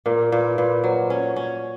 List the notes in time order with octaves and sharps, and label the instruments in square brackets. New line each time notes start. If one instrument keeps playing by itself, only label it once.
[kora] A#2 [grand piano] A#4
[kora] A#2 [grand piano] B4
[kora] A#2 [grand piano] B4
[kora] F#3 [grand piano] C5
[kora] C#4 [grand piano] C#5
[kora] C#4